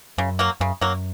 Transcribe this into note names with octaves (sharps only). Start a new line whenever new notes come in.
F#2 C#3
F#3 A#3
F#2 C#3
F#2 F#3 A#3